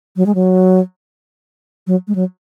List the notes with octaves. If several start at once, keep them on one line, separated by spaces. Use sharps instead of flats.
F#3
G#3
F#3
F#3
G#3
F#3